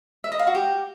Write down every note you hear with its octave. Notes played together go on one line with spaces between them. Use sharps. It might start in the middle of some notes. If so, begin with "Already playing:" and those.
E5
D#5
F5
F#4
G4